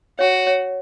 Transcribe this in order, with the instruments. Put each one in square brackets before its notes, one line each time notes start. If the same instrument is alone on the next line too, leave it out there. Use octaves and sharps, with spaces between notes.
[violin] F#4 [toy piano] C#5
[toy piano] C#5